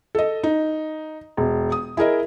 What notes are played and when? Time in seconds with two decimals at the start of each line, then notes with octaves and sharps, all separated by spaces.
0.15 A4 D#5
0.43 D#4
1.37 E1
1.72 D#6
1.97 E4 G#4 A#4 D#5